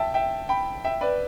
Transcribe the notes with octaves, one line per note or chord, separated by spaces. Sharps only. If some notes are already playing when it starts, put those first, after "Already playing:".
Already playing: E5 G5 A5
E5 G5
G5 B5
E5 G5
B4 D5